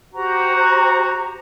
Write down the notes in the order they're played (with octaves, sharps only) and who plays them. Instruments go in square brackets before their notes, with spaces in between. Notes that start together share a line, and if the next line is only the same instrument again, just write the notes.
[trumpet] F#4 [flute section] G4 C5 A#5